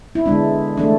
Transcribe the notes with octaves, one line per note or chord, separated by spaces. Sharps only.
E4
D3 G#3 B3 D4
E3 A3 D4